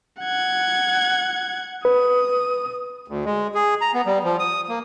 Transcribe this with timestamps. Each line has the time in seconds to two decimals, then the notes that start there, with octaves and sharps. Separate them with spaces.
0.21 F#5 G#6
1.85 B4 D#6
3.08 D2
3.25 G#3
3.55 G#4
3.81 A#5
3.94 B3
4.06 G3
4.24 F3
4.39 D#6
4.69 A#3